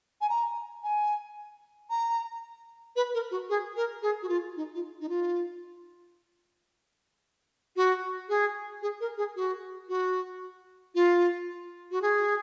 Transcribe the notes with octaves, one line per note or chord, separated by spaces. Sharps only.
G#5
A#5
G#5
A#5
B4
A#4
F#4
G#4
A#4
G#4
F#4
F4
D#4
F4
D#4
F4
F#4
G#4
G#4
A#4
G#4
F#4
F#4
F4
F#4
G#4